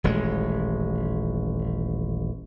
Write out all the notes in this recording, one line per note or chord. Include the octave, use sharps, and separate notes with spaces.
D#1 A1 G#3